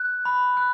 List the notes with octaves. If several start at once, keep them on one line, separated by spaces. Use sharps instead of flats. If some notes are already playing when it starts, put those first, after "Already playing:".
Already playing: F#6
B5
F#6